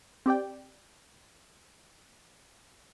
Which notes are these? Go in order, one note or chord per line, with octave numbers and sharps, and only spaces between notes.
C4 G4 D5 G5